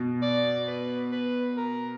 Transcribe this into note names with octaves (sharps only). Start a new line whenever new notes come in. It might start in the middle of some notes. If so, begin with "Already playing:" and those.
Already playing: B2
D5
B4
B4
A#4